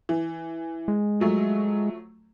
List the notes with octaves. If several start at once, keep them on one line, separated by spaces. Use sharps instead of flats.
E3
G#3
F3 F#3 A3